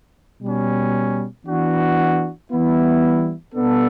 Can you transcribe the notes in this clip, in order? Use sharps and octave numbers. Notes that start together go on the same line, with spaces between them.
B2 G3 C#4
E3 B3 D4 F#4
E3 G3 B3 E4
B2 G3 B3 D4 A4